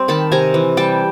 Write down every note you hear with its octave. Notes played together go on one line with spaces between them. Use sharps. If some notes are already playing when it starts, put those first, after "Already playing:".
Already playing: G3 C4
D#3 A5 B5
C3 G#5 A#5
E3
G3 G5 A5